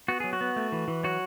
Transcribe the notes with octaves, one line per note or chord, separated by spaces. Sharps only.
B3 F#4
F#3 G#4
F#4
B3
A3
E3
E3
F#3 F#4